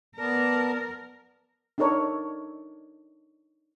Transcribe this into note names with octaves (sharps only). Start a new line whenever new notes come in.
B3 A#4 D5 A5
D4 D#4 A4 A#4 C#5 D5